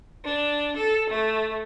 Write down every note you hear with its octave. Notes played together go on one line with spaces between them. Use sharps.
D4
A4
A3